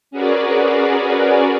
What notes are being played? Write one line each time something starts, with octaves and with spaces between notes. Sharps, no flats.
C#4 F#4 G#4 A#4 B4 D5